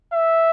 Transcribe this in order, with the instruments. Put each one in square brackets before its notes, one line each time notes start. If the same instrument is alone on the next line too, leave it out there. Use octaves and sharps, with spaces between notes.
[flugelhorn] E5